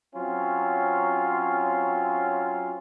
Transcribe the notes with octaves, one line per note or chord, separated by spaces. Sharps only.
F#3 C4 C#4 F4